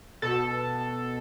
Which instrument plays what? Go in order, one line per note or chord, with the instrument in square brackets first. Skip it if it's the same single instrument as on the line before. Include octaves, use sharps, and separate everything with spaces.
[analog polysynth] B2 A4